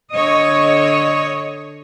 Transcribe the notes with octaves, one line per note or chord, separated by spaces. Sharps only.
D3 C#5 D#5